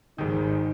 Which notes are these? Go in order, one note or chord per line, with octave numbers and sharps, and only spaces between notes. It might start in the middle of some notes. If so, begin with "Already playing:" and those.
G#1 G#2 D#3 D#4